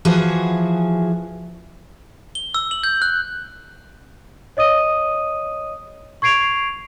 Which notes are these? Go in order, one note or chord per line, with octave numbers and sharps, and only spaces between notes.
E3 F3 F#4 G#4
G7
E6
F#7
G6
F#6
C#5 D#5 D#6 D#7
C#6 G#6 C7 D7 F7